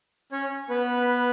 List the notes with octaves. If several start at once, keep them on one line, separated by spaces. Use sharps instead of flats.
C#4 C#5
B3 B4